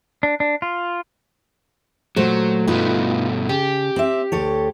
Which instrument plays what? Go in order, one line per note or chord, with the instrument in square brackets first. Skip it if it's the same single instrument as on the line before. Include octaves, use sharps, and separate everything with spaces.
[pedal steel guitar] D4
D4
F4
[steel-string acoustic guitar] A#2 A3 C5 [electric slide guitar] F#3
[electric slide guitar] G2 B2 A3 [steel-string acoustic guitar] D#4 F4 B4
[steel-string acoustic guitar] C#3 [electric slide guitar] G4
[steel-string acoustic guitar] C4 E5
D2 A4 C#5